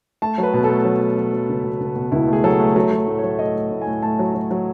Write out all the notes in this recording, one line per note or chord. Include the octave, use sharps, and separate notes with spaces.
A3 A5
F#3
B4
B2
A4
A3
F#3
F#3
F#3
F#3
C#2
B2
C#2
B2
C#2 E4
A3 G#4
F#3 A4
A3
F#3 A4
F#3
A2
F#3 C#5
A3 D#5
A3
A2
A2 G#5
A3 A5
F#3
F#3
F#3